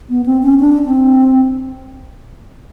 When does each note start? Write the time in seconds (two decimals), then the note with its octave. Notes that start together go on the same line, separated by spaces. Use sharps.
0.10 B3
0.26 C4
0.43 C#4
0.60 D4
0.86 C4